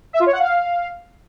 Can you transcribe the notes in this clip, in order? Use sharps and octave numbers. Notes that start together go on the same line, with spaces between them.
E5
F4
C#5
F#5
F5